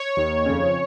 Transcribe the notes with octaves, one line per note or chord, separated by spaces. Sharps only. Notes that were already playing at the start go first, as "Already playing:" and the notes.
Already playing: C#5
D#2 D#3
F2 C#3